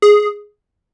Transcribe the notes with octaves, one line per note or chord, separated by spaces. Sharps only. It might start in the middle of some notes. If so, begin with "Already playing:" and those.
G#4